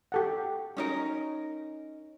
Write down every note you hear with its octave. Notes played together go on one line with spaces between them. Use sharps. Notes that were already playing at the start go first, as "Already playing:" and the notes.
G4 A4 F#5
C#4 D#4 A#4